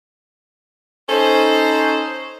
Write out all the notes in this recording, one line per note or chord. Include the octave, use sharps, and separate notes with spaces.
C#4 D#4 A4 C5